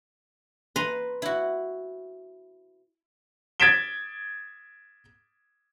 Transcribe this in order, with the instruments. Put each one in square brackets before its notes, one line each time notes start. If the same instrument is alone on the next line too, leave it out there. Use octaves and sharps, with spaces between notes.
[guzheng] B4 A#5 C6
E4 F#4
[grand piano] G#6 A6 B6 D7 E7 G7